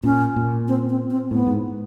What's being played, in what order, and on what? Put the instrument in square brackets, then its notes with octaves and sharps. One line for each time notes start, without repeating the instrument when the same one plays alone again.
[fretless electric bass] A#2 [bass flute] C#4
[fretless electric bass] A#2
[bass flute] C4
C4
C4
[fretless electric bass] A2 [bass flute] B3
[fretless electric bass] G#2